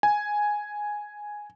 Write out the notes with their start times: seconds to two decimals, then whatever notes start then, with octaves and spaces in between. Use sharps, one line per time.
0.03 G#5